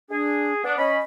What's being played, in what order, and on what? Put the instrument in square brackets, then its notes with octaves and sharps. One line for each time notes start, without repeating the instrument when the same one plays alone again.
[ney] D4 [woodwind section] G#4
[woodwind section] B3 D4 [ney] D5
[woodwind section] C#4 B5 [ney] D#5